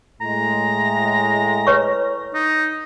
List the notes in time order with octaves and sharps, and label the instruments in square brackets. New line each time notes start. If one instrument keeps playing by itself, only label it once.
[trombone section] A2 G#3 [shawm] A#5
[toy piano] B4 C#5 C#6
[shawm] D#4